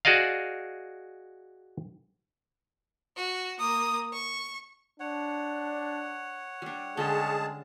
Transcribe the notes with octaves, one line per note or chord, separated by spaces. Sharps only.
F#4 G#4 D5 D#5 F5
F#4
A#3 D#6
C#6
D4 C#5 F#5
G3 D4
D3 G3 G#3 C#4 G#4 A5